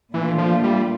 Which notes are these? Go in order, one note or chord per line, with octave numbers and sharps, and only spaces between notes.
A#2 E3 A3 D4 F4
F3
G3